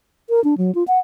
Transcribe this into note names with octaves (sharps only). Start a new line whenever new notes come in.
A#4
D4
F#3
F4
F#5